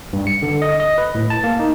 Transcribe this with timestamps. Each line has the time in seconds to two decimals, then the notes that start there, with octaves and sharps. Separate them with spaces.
0.13 G2
0.27 C#7
0.42 D3
0.62 D#5
0.80 D#5
0.98 B4
1.15 A2
1.30 A5
1.44 A#3
1.59 D#4